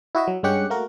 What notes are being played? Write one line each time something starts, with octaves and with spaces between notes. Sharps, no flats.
E4 F#4 D#5 E5
F#3
G2 G#3 C#4 G4 F#5 C#7
A3 A#3 F#4 A#4